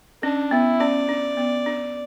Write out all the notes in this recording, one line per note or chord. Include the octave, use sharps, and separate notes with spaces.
C#4 D4
B3 E4
C#4 D5
D4
B3
D4